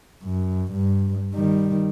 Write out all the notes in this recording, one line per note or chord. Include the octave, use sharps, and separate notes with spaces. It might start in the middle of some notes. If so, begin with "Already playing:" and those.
F#2
G2
D#3 G3